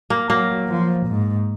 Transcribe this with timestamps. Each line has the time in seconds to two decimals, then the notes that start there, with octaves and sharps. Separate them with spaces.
0.10 A#3
0.30 F#3 A#3
0.69 F3
1.07 G#2